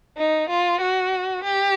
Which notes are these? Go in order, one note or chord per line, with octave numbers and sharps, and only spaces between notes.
D#4
F4
F#4
G4